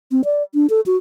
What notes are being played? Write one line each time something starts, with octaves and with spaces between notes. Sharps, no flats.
C4
D5
D4
A4
F#4